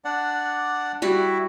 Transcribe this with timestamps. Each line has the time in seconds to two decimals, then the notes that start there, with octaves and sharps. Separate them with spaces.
0.05 D4 D5 F#5
1.02 G3 E4 F#4 E5